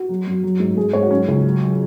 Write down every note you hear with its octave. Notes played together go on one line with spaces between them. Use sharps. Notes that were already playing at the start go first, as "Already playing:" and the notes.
Already playing: F#4
F#3
F#2
F#3
G#2
G#2 G#4
G#2 C#5
F#4
F#3 C#4
C#2
F#3
F#3